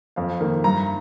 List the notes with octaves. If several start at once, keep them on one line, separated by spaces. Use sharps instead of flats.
F2 F5
D#3 A#3
G2 A#5